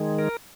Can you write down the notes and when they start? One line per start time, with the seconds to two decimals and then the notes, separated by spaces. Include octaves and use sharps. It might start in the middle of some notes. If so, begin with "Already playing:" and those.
Already playing: D#3 G#3
0.19 A#4